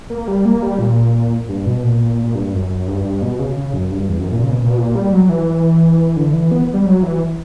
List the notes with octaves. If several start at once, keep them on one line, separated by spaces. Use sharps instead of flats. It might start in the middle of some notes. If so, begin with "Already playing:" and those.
A#3
A#3
G3
A#3
G3
A#2
G2
B2
A#2
A#2
G2
F#2
F#2
G2
G2
B2
C#3
C#3
F#2
G2
E2
F#2
A#2
C#3
B2
A#2
B2
A#2
G3
F#3
E3
D3
E3
B3
G3
F#3
E3